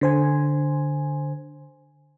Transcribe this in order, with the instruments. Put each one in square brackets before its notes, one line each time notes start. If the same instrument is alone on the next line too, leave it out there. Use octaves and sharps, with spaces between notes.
[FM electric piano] D3 C5 G#5